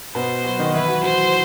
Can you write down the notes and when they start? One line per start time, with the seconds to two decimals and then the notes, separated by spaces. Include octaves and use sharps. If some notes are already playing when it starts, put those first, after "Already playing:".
0.15 B2 B3 C5
0.44 F#3 F#4
0.59 D#3 D#4
0.74 E3 E4 B4
0.88 F#3 F#4
1.03 F#3 F#4 C5